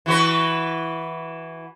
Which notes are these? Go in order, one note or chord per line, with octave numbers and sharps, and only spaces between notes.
E3 F#4 B4